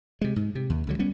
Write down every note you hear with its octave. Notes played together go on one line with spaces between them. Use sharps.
C3 G#3
G#2
C3
D#2
C#2 D3 F#3
G3 B3 C#4